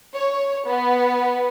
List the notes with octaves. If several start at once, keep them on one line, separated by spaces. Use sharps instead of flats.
C#5
B3